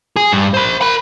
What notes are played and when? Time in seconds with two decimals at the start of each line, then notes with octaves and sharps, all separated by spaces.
0.16 G#4
0.33 G2
0.54 C5 B5
0.81 A#4 B5